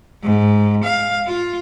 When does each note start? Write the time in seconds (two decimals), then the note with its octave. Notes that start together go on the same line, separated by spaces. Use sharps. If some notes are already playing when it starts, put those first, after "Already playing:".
0.23 G#2
0.84 F5
1.27 F4